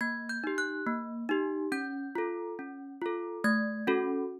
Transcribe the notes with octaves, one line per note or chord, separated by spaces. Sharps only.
A#3 G#6
G6
D#4 G4
F#6
A#3
D#4 G4
C#4 G6
F4 A4
C#4
F4 A4
A3 G#6
C#4 F#4 A4